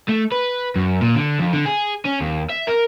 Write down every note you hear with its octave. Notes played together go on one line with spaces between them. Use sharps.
A3
B4
F#2
A#2
D3
F2
D3
G#4
C#4
D#2
E5
A#4